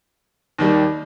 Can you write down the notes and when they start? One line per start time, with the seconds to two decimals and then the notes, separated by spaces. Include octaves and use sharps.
0.59 D#2 D#3 G3